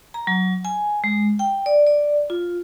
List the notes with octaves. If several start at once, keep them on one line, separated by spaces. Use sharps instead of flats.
A#5
F#3
G#5
G#3
G5
D5
D5
F4